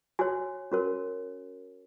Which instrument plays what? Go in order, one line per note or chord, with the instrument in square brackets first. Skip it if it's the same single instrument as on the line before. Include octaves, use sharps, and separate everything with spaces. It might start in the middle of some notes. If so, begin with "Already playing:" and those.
[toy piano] F#4 C#5 G#5
C#4 F#4 A#4 C#5